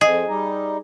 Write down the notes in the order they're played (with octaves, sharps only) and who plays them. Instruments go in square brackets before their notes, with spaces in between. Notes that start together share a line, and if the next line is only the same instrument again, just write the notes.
[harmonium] F2 [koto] G#4 [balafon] D#5
[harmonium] G3 D#4